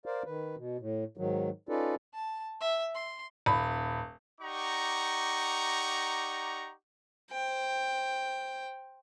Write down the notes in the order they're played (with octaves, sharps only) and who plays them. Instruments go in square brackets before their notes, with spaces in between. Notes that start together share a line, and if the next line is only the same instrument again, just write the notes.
[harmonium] A#4 C5 D5 F5
D#3 B4
B2
A2
G#2 D#3 F#3
C#4 D#4 F4 A4 B4 D5
[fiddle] A5
E5
C6
[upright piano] D#1 B5
[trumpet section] D#4 G4 D5 F#5 A#5 C#6
[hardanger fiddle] C5 G5